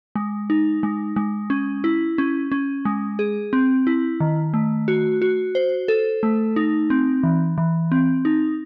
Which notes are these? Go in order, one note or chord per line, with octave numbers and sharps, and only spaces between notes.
G#3
D#4
G#3
G#3
C#4
E4
C#4
C#4
G#3
G#4
C4
E4
D#3
A3
F#4
F#4
C5
A4
A3
D#4
C4
E3
E3
C4
D#4